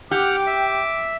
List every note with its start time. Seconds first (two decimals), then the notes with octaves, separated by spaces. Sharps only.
0.11 G4 F#5 G5 D6 F6
0.47 E5